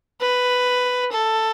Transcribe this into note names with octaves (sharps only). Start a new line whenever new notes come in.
B4
A4